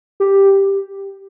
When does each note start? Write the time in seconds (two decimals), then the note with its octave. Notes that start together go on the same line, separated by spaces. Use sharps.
0.20 G4